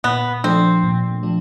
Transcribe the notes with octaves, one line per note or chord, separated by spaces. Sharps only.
A#2 B3
F3 A3 C4 D4
A#2
F3 A3 D4